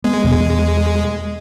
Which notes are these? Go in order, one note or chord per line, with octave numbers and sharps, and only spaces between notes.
G#3 B3
E2 B2